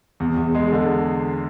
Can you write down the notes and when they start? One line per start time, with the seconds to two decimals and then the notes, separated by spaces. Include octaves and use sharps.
0.20 E2
0.37 E2
0.55 G#3
0.72 D3